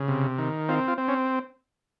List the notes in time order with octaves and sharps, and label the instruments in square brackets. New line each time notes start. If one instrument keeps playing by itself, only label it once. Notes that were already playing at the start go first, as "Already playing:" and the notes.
Already playing: [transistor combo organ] C#3
C3
D#3
C4 F4
F4
C4
C#4